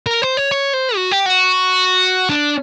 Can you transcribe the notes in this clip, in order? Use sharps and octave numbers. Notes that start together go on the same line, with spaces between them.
A#4
C5
C#5
C#5
C5
F#4
G4
F#4
D4